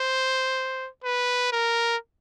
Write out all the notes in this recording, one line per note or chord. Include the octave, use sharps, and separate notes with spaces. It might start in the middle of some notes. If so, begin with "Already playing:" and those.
Already playing: C5
B4
A#4